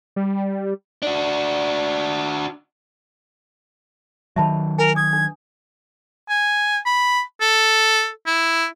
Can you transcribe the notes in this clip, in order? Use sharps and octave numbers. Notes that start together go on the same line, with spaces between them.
G3
D4 F#4
D#3 F#3 E5 A5 B5
A#4 G#5
D#6 G#6
D4
G#5
B5
A4
E4